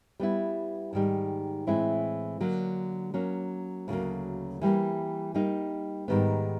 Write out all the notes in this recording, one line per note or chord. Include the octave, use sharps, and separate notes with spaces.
G3 B3 E4
G#2 D#3 G3
A2 E3 G#3 C4 E4
D3 F#3 A#3
F#3 A#3 C#4
D2 C#3 F#3 A#3
E3 G3 A#3
G3 A#3 D#4
G#2 D#3 G3 B3